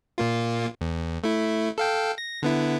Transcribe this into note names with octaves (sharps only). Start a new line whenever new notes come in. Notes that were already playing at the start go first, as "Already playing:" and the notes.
A#2 A#3 F4
E2
A3 E4
A4 F5 G5
A#6
D3 B3 E4